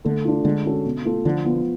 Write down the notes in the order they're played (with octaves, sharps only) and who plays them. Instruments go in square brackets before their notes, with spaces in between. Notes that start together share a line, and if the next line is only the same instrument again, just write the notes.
[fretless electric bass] D3 [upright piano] A3
[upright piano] D4 F4
[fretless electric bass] D3 [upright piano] G#3
[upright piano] C#4 F#4 A4
B2
A3 F4 A4
[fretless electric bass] D3 [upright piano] F3
[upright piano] B3 F4